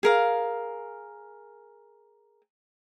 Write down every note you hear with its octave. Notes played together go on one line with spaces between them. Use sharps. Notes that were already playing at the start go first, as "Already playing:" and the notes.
G#4 A#4 F5